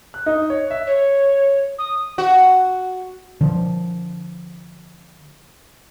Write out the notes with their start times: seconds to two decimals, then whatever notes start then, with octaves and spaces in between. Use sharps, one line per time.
0.14 F#6
0.26 D#4
0.50 C#5
0.71 E5
0.87 C#5
1.78 D#6
2.18 F#4
3.41 D3 F3